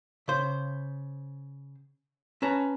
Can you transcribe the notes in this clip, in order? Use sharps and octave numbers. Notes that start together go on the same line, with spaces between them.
C#3 C5
C#4 B4 A5 A#5